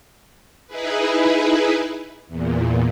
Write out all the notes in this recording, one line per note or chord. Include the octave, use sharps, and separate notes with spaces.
D#4 E4 G#4 B4
E2 A#2